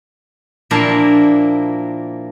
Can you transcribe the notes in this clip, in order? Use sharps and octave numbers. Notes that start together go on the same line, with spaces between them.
A#2 F3 A#3 D4 E4 F5